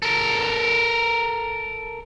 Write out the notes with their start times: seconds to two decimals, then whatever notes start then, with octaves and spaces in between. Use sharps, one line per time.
0.02 A4 A#4